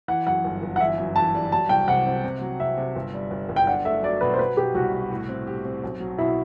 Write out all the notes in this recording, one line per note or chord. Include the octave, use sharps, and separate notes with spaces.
E3 F#5
F#2 F#5
G1
G1
F#5
E3 E5
F#2
E3 A5
G3
F#3 A5
C2 G5
C3 F#5
C4
C3
F#3
C3 E5
C3
G1
G3
G1
G1
G5
D4 F#5
A3 E5
F#3 D5
B2 B4
C5
F#3 B4
B2 G4
C2 F#4
B2
A2
C4
G4
C4
B1
F#3
B2 E4